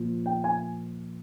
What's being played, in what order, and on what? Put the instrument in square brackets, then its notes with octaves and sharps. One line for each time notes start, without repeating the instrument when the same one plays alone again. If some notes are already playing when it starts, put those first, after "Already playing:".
Already playing: [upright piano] A#2 F3
G5
G#5